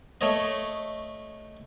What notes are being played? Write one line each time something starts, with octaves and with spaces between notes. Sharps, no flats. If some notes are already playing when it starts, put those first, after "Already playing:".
A3 C#5 D#5